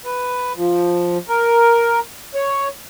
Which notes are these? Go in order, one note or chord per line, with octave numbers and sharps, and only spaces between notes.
B4
F3
A#4
C#5